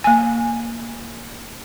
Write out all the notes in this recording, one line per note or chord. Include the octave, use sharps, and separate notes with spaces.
A#3 G#5